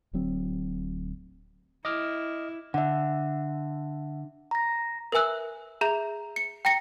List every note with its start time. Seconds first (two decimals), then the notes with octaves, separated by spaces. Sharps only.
0.13 D1 D2 F#3 C4
1.85 E4 D#5 D6 F6
2.74 D3 E5 F#5
4.51 A#5 A#6
5.12 A#4 B4 E5 G#5 E6 F#6
5.81 G#4 E5 A#5 G6 F7
6.36 C#7
6.65 G5 A#5 A#6 C#7